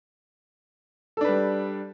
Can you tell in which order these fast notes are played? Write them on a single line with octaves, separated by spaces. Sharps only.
A4 D4 B4 G3